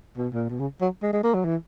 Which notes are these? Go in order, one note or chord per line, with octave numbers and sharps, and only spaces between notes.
B2
A#2
B2
C#3
F#3
G#3
G#3
A#3
F#3
E3